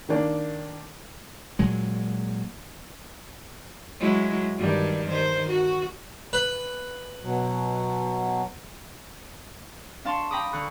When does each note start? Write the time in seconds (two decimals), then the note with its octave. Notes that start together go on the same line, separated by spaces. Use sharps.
0.09 D#3 A#3 D4
1.59 A#2 F#3 G#3
4.00 F#3 G#3 E4
4.58 G2 D#3 G3
5.07 D#3 C5
5.49 F#4
6.33 B4
7.23 B2 F#3
10.05 D4 F5 A5 C6 C#6
10.31 G5 A#5 B5 D6 D#6
10.53 D3 C#6 F#6